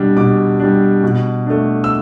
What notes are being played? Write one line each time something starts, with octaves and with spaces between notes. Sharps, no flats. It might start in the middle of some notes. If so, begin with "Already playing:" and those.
Already playing: B2 G3 D4
B2 D6
G3 D4
B2
A3 D4
E6